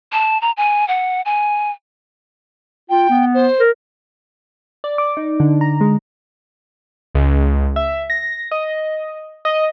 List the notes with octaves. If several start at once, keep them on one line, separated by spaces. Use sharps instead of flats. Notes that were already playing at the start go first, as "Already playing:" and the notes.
A5
A#5
G#5
F#5
G#5
F4 G5
B3
C5
A#4
D5
D6
D#4
D3
A#5
G#3
C#2
E5
A#6
D#5
D#5